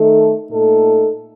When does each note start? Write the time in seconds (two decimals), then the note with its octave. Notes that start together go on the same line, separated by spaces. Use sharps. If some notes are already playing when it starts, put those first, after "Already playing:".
Already playing: D#3 A3 D#4 A4
0.50 A#2 A3 D#4 A4